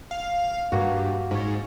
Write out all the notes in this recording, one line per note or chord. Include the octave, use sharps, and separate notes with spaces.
F5
G2 A#3 F#4
G#2 C#4 C#5